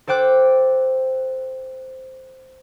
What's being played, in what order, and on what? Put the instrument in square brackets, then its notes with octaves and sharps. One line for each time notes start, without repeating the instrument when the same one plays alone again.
[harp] A4 C5 G5 D6 F#6